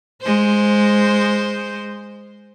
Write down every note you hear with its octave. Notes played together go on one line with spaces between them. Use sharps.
G#3 C5